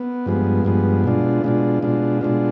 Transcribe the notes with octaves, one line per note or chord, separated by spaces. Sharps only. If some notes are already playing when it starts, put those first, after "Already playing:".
Already playing: B3
G2 F3 G#3 B3
G2 F3 G#3 B3
B2 G#3 D4 F4
B2 G#3 D4 F4
B2 G#3 D4 F4
B2 G#3 D4 F4